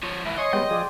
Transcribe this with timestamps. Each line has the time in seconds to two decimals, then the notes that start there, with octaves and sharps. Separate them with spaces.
0.03 F3 C#5
0.25 G#2 E3 E5
0.38 C#5 D#5 G#5 C6 C#6
0.53 G3 G#3 B3 G5 C6
0.71 F3 G#4 D5